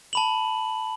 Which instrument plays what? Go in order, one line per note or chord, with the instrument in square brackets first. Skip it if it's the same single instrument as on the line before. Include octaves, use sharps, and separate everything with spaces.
[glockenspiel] A5 B5 F#7